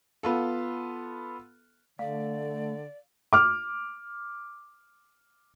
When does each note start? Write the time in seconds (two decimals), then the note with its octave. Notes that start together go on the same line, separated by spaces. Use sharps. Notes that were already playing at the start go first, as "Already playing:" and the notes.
0.23 B3 F4 A4
1.99 D3 A3 D5 F5
3.33 D6 F6